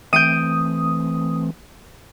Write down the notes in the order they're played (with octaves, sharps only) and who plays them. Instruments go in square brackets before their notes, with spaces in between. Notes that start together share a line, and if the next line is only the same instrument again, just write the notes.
[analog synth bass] E3 [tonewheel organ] A3 C4 [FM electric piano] D#6 [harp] G6 D7 D#7